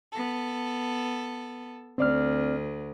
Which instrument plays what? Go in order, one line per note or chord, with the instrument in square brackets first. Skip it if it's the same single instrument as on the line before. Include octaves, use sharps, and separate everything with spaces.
[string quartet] B3 A4
[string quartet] D2 [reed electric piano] C4 D5 F6